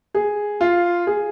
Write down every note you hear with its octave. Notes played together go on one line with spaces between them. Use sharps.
G#4
F4
G#4